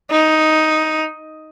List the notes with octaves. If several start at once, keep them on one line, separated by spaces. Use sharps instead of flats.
D#4